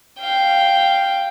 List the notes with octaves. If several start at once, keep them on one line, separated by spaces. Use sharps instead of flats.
F5 G5